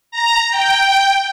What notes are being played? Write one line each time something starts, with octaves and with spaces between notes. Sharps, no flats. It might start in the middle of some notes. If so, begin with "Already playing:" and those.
A#5
G5